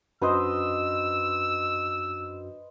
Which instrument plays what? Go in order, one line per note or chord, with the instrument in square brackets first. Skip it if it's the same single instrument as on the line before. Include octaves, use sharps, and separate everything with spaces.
[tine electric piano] F#2 D4 F#4 [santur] B4 C5 D#5 [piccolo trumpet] E6